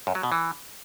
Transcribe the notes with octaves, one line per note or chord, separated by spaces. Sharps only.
F#2
F#3
B2
E3